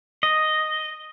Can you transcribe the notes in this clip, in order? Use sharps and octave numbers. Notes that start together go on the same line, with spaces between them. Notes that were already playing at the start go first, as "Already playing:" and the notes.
D#5